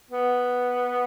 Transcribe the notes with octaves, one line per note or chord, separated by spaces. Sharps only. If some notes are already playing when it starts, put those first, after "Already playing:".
B3